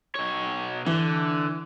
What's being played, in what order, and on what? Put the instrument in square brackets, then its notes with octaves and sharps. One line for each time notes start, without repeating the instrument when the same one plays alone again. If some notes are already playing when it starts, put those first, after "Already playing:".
[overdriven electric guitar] B2 C#5
[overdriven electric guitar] D3 [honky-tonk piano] E3